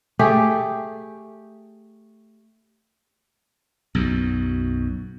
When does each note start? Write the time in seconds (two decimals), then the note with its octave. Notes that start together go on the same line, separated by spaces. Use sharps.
0.19 A3 G4 G#4
3.95 B1 F#2